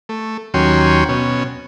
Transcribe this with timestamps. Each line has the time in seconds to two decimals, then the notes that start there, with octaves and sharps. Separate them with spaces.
0.09 A3
0.54 D#2 F#3 C#4 G5 C6
1.09 B2 C#4